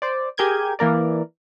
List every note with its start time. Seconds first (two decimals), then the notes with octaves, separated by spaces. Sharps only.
0.02 C5 D5
0.37 G4 G#4 A#4 G6 G#6 D#7
0.79 E3 A#3 A#4 D5